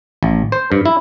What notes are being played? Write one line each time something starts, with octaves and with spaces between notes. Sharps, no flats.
A1
C5
G2
E4